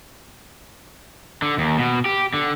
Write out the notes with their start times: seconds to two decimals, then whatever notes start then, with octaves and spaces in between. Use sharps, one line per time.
1.42 D3
1.58 D#2
1.78 B2
2.05 G4
2.34 D3